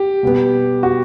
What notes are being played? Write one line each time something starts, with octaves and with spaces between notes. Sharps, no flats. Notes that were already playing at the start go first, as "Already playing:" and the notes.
Already playing: G4
B2 G3 B3
F#4